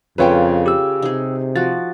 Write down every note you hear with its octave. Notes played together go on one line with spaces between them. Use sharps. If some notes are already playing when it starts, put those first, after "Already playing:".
F2 C#3 F4 A4 B4 C#5 G5
G4 E6
C3 D#4 G#4
F3 F#4 A6